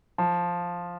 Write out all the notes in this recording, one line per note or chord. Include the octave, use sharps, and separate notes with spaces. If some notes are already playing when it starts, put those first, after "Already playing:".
F3